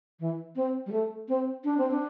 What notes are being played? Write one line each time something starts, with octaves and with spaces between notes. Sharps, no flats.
E3
C4
G3
A3
C4
D4
C4
D4